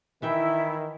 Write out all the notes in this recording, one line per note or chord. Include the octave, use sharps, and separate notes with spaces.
D#3 E3 E4 E5 G5